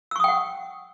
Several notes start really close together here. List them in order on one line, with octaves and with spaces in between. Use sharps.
E6 C#6 D#6 G5 F#5